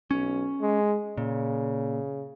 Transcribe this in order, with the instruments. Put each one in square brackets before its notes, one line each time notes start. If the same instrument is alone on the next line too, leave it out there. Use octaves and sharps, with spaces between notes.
[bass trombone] B1 [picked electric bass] C#4
[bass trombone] G#3
[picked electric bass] A#2 [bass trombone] C#3